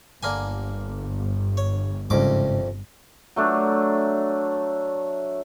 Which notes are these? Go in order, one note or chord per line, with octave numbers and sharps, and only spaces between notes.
G1 D3 A#3 G#5
C#5
C2 F2 G#2 C#3 D6
F#3 A3 D4